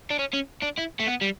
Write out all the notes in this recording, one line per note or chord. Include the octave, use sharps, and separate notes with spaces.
D4
C#4
C#4
D4
E4
A3
B3
G3